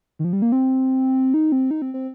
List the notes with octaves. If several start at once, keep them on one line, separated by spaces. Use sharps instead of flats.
D#3
F3
G3
A#3
C4
D#4
C4
D#4
C4
C4